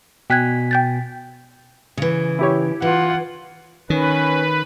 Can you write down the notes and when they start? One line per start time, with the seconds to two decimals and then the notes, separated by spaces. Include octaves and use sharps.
0.30 B2 G5 G#5 F#6 G#6 B6
0.71 G5 G6 A6
1.97 C#3 E3
2.39 E4 G4 C#5
2.82 E3 F4 F#5
3.90 D#3 C#4 B4